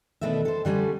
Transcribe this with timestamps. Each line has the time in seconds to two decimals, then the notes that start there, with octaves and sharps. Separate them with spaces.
0.21 B2 D#3 A3 D4 E5
0.45 A4 C5
0.65 D3 G3 A3 C#4